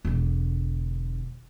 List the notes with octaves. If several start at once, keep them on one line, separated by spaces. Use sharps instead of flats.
E1 D3